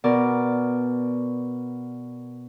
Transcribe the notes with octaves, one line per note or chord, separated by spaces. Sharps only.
B2 A#4 D5